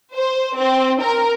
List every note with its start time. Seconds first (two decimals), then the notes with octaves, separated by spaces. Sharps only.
0.14 C5
0.57 C4
1.02 A#4